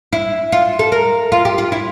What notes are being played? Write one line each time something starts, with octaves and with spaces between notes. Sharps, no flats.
E4
F4
A4
A#4
F4
G4
F4
E4